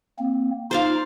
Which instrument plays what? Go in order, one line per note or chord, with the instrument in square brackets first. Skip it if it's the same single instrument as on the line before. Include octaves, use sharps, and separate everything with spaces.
[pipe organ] A#3 C4
[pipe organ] D#4 F4 [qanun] C5 D5 F5